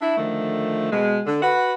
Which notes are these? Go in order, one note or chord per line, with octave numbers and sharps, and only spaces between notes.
D4 E4 E5
D3 D#3 F3 A3
B2 G#3
D3 A4
F#4 B4 F#5